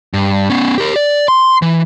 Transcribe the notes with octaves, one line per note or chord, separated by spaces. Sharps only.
G2
B3 C#4
G4 A#4
D5
C6
E3